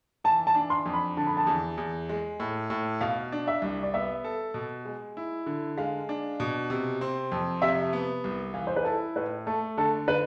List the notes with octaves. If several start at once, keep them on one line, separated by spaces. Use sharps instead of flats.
E3 A5
A5
D4
C6
F2
B5
D3 A5
B5
A5
E2
E2
G#3
A2
A2
B2 F5
D4
E5
C2
D5
B3 E5
A4
B2
G#3
E4
D3
G#3 F5
D4
B2
C3
C4
F2
C3 E5
B3
C2
E3 F5
C5
B4
E4 A4
A2 B4
A3 A4
D3 A4
D3 B4